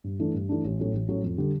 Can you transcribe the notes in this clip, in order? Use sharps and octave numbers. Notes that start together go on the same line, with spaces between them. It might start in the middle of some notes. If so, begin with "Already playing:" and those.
G2
E3 A3 D4
G2
E3 A3 D4
A1
A2 F#3 A3 C#4
A1
A2 F#3 A3 C#4
F2
D3 G3